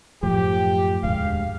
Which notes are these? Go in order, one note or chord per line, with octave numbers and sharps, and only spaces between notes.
F#2 A2 F3 G4
E1 D2 G#2 F5